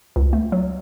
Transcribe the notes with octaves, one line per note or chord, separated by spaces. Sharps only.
C#2
A3
F#3